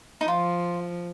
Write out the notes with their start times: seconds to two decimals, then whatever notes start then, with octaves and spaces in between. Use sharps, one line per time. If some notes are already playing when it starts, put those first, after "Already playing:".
0.21 D#4
0.28 F3 F4